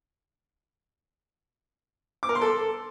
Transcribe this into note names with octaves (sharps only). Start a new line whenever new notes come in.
D6
A#4
C6
A4